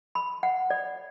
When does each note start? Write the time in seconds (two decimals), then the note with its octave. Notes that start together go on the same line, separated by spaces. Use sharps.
0.15 B5
0.43 F#5
0.70 D5